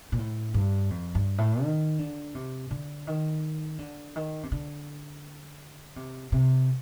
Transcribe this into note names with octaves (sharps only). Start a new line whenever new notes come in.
A#2
A2
G2
F2
G2
A2
D#3
D3
C3
D3
D#3
D3
D#3
C3
D3
C3
C3